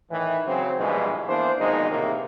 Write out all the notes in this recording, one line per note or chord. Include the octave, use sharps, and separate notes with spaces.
A2 D#3 E3
C#3 F#3 C4
A#1 G2 B2 E3 G#3
E3 A#3 B3 D4 C5
A#1 B2 D#3 G#3 D#4
A2 C3 D#3 E3 A#3